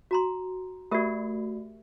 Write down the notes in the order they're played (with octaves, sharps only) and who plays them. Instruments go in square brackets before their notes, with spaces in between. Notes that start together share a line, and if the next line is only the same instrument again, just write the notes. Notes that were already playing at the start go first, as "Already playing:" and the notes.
[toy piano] F#4 A#5 C6
[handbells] A3 F#4 [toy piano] G4 A#4 E5